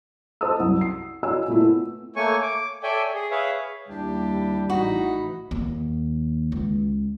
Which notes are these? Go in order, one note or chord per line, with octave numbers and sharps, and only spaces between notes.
C5 D#5 A5 D#6 E6
C2 F#2
C7
F#4 C#5 D#5 G#5 E6
A#2 A3 E4
B3
A3 A#3 C#5 G#5 C#6
D6
A4 C#5 D5 E5 G5 G#5
G#4
G#4 B4 C#5 E5 F5
D#2 G3 D4 E4 G4
A1 E3 D#4 F#4 B5
D#2
C#2